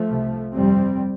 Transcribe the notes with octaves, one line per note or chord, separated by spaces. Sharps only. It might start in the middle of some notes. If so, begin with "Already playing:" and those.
Already playing: F3 A3
C2 C3
G1 F2 C3 G3 C4